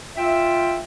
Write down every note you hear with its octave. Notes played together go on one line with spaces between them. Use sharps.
F4 E5 G5